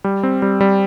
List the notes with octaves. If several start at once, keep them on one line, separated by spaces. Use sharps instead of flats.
G3
C4
G3
G3